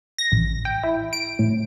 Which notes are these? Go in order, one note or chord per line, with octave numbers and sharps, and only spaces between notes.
A#6
A1
G5
E4
D7
A2